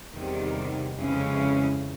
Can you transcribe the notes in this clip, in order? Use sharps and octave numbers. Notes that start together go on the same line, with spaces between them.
E2 C3 D#3 G3
F2 C#3 E3 G#3 C#4